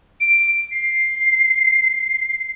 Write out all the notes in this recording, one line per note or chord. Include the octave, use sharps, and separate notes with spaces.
D7
C7